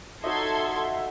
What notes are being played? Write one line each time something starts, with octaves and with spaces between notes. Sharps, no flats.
F#3 D#4 A4 D#5 E5 C6 G#6